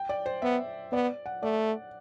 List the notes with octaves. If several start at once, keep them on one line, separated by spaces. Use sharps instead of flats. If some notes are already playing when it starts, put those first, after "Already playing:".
Already playing: G5
D5
C5
B3 E5
B3 D5
F#5
A3 D5